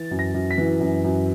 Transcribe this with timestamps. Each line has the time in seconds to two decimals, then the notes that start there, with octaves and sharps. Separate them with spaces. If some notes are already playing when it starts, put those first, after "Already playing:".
Already playing: E3 A6
0.11 F#2
0.19 A#6
0.34 F#2
0.51 B6
0.58 E3
0.80 F#2
1.04 F#2